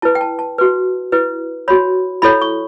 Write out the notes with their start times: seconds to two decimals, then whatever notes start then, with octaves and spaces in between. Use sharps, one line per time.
0.02 E4 B4 A5
0.15 G5
0.21 A5
0.39 A5
0.58 F#4 B4
1.12 E4 B4
1.68 F#4 C#5 B5
2.22 E4 A4 C#5 B5
2.41 C#6